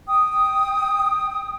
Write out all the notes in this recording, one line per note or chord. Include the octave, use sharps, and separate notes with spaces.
G5 D#6